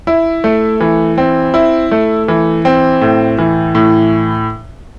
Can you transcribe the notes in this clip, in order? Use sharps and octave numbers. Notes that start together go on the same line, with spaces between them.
E4
A3
E3
C4
E4
A3
E3
C4
A2
E3
A2